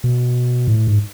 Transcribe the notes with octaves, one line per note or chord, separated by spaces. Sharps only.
B2
A2
G#2